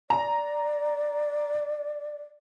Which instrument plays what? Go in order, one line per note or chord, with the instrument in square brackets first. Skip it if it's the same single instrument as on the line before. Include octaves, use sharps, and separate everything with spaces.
[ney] D5 [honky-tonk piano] A#5